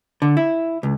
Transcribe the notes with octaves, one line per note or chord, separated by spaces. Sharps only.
D3
E4
C#2